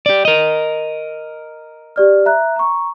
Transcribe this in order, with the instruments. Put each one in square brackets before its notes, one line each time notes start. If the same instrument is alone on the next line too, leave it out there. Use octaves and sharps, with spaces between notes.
[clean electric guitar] G4 D5
A#4 D#5
[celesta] G4 D5 F6
E5 A#5 F#6
A#5 C#6